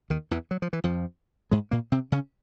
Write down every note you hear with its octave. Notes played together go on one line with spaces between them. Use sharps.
D#2 D#3
E2 E3
F#3
F3
E3
F2 F3
G#2 G#3
A#2 A#3
C3 C4
C#3 C#4